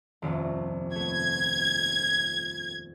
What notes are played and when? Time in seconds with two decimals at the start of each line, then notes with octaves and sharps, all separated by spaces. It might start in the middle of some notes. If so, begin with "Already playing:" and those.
0.22 D#1 C2 F2
0.95 A3 B3 G#6